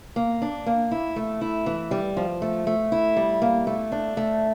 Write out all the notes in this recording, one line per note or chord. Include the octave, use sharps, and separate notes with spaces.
A#3
D4
A#3
E4
A3
E4
E3
G3
F3
A3
A3
E4
G3
A#3
A3
D4
A3